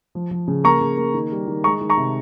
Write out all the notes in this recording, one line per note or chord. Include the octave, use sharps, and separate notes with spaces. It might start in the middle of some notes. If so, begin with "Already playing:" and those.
F3
F3
C#3
A#3 A#5 C#6
C#3
A#3
D#3
G3
D#3
G#3 A#5 C#6
D#3
A#5 C#6
C3